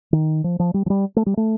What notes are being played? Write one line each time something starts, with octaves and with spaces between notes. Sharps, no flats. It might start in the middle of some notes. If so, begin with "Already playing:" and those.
D#3
F3
F3
G3
F3
G3
A3
G3
A3